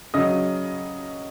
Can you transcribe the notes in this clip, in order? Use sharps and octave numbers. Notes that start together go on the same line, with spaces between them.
C#3 F#3 D#5 D#6